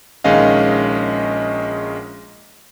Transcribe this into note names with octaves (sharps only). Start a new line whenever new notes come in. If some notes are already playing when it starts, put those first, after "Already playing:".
A#1 D#3 G#3 C#4 D#5 F5